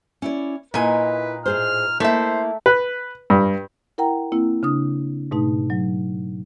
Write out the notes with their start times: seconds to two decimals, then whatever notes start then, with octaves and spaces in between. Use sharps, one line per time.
0.22 C#4 E4 D5
0.74 A#2 A#3 D#4 E4 B4 G#5
1.46 A2 G#4 C5 F6
2.00 A3 A#3 E4 C5 E5
2.66 B4
3.30 G2
3.98 E4 A#4 F#5 G5 A#5
4.32 A#3 C4 E4
4.63 C#3 D4 D#6
5.31 G#2 B2 A3 D#4
5.70 F#3